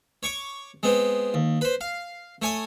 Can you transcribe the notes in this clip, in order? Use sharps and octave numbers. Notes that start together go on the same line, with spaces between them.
C#5 C#6 D6
G#3 B3 C4
D#2
B4 C5
F5
A3 C#5 G#5 D#6